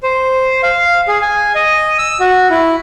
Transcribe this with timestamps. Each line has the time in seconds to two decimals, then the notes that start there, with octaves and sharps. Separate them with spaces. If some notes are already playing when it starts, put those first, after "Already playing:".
0.03 C5
0.63 F5
1.08 G#4
1.22 G#5
1.55 D#5
1.99 E6
2.20 F#4
2.51 E4